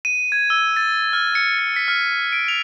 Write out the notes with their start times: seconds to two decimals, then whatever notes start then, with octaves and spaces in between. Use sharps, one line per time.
0.05 D#7
0.32 G#6
0.50 E6
0.77 A6
1.13 F6
1.35 C#7
1.59 A6
1.76 B6
1.88 F6
2.33 D7
2.48 F7